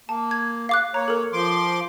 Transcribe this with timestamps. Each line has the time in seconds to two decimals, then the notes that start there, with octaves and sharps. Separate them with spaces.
0.09 A#3 A5
0.31 G#6
0.69 F5 D6 F#6
0.94 A#3 C#5 A#5
1.08 A4 A#4
1.33 F3 C6 D6